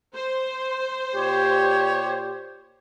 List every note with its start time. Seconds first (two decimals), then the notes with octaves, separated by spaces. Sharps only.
0.14 C5
1.15 A#2 G4 C#5